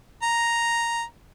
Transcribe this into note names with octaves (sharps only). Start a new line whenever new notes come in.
A#5